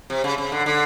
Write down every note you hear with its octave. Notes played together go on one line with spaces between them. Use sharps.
C3
C#3
C#3
D3
D3